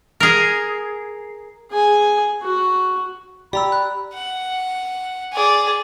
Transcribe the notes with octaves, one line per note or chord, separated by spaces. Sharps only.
G#4 A#4
G#4 G#5
F#4
G4 D5 A#5 B5 E6
F#6
F#5
G#4 D5